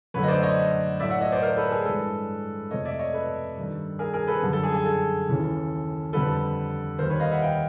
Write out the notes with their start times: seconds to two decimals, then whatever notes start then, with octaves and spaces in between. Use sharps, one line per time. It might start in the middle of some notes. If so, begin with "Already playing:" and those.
0.14 F#2 D3 F#3 A3 B4 C#5
0.23 D#5
0.28 C5 D5
0.43 C#5 D#5
1.00 A2 F#3 A3 D5 E5
1.10 E5 F#5
1.21 C#5 D#5
1.32 C5 D5
1.42 A#4 C5
1.57 A4 B4
1.71 G#4 A#4
1.85 G2 E3 G#3 A4 B4
2.71 F2 C3 F3 A3 C#5 D#5
2.85 D5 E5
2.99 C#5 D#5
3.14 A4 B4
3.56 G2 D#3 G3
3.99 G#4 A#4
4.14 G#4 A#4
4.27 A4 B4
4.42 F#2 D3 G3
4.53 A4
4.64 G#4
4.74 G#4
4.86 A4
5.28 D#2 C#3 E3
6.13 F2 D3 G3 A4 B4
6.99 D#2 D#3 G3 A#4 C5
7.10 B4 C#5
7.20 D#5 F5
7.31 E5 F#5
7.42 F5 G5